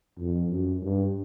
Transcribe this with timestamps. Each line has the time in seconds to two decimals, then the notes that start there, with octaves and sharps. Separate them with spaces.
0.18 F2
0.50 F#2
0.83 G2